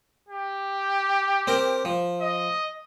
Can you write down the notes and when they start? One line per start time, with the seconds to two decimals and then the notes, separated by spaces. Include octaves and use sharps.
0.28 G4
1.47 C4 A#4
1.85 F3
2.21 D#5